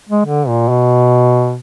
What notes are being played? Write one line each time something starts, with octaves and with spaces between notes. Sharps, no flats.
G#3
D3
A#2
B2